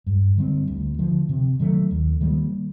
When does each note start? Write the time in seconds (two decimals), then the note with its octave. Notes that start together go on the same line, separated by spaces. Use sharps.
0.06 G2
0.37 D3 G3 C4
0.67 D2
0.99 D3 F3
1.29 C3
1.59 D#3 F#3 A3
1.91 D#2
2.21 D#3 G3 A#3